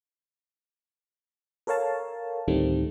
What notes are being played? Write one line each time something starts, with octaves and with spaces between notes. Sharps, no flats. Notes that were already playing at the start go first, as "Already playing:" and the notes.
A4 A#4 C#5 F5 A5
D2 A2 D#3 G3 A3 C4